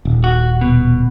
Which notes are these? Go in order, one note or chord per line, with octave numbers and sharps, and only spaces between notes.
D#1
F#4
B2